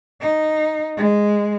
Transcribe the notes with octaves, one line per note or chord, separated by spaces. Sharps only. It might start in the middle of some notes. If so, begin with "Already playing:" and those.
D#4
G#3